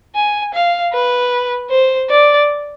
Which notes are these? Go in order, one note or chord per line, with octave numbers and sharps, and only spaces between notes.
G#5
F5
B4
C5
D5